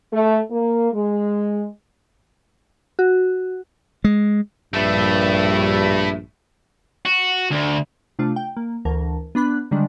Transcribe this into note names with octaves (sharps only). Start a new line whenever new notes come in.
A3
A#3
G#3
F#4
G#3
A#1 G2 A3 E4
F#4
D2
C3 A3 D4 F4
G5
A#3
D2 E3 A#4 A5
B3 D4 B5 F#6
D3 D#3 G3 G#3 D4